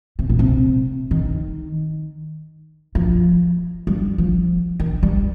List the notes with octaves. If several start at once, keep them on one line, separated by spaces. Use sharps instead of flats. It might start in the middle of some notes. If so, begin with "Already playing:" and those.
C3
A#2
C3
D#3
F3
G3
F3
D#3
G3